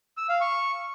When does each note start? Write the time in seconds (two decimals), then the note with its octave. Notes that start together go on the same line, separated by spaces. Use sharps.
0.17 E6
0.29 F5
0.41 C#6